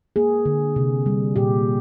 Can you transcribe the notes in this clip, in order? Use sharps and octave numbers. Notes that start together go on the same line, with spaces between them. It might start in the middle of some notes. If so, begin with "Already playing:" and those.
A#3 G#4
D3
C3
G3
A#2 G4